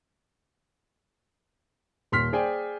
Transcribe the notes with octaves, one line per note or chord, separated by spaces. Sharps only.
D#1 C6 F6 B6
G#4 C5 D5 G5 G#5